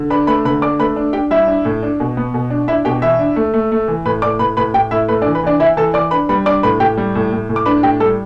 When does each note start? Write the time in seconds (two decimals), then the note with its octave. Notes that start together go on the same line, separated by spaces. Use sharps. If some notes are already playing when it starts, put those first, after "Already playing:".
Already playing: D3
0.10 D4 B4 B5
0.27 A3 B4 B5
0.45 D3 B4 B5
0.62 D4 D5 D6
0.79 A3 B4 B5
0.96 D4
1.13 D4 G4 G5
1.30 G3 E4 E5
1.47 D4
1.65 A2
1.83 D4
2.00 B2
2.17 B3
2.34 B2
2.50 D4
2.68 D4 E4 E5
2.85 B2 G4 G5
3.02 E3 E4 E5
3.19 D4
3.36 A3
3.54 A3
3.72 A3
3.88 E3
4.05 A2 B4
4.22 A2 D5 D6
4.39 A2 B4 B5
4.57 A2 B4 B5
4.74 A2 G4 G5
4.91 A2 E4 E5
5.08 A3 B4
5.22 D4 D5
5.26 E3
5.35 B4
5.43 E3 D4 D5
5.59 E3 E4 E5
5.77 E3 A4 A5
5.94 E3 D5 D6
6.11 D4 B4 B5
6.29 G3 B4 B5
6.46 D4 D5 D6
6.63 A2 B4 B5
6.80 A2 G4 G5
6.97 G3
7.15 A2
7.32 A2
7.49 A2
7.56 D6
7.66 D4 B4 B5
7.83 A2 G4 G5
8.00 G3 A4